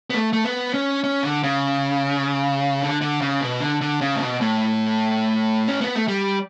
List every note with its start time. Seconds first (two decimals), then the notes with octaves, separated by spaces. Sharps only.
0.10 B3
0.14 A3
0.33 A3
0.45 B3
0.74 C#4
1.04 C#4
1.23 D3
1.43 C#3
2.82 D3
3.01 D3
3.21 C#3
3.41 B2
3.60 D3
3.81 D3
4.01 C#3
4.15 A2
4.21 B2
4.41 A2
5.68 C#4
5.81 B3
5.95 A3
6.08 G3